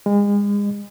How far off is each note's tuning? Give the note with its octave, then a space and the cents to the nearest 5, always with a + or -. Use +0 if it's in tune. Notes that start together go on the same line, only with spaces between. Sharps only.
G#3 -35